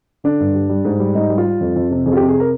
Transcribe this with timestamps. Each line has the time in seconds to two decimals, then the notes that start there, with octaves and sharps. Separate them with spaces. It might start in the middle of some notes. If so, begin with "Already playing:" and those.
0.24 D3 D4
0.40 G2
0.55 G3
0.69 G3
0.85 G#2
1.00 G3
1.15 G#2 D#4
1.30 G3
1.38 F4
1.45 G3
1.61 F2
1.76 F2
1.91 C3
2.06 F2 G#4
2.13 F4
2.17 G4
2.21 C3
2.28 G#4
2.40 A#4